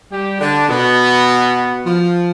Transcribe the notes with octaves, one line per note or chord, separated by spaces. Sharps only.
G3 G4
D3 D4
B2 B3
F3